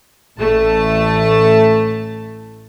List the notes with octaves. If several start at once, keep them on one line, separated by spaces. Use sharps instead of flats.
A1 A3 A5